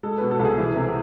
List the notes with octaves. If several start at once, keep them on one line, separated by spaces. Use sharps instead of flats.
G#3 A4
B2 B4
A4
C2
G#4
E3
C3